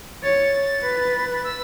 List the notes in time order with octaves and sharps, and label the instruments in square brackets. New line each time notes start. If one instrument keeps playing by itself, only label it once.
[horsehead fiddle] C#5 [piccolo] A6
[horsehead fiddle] B4
[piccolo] E6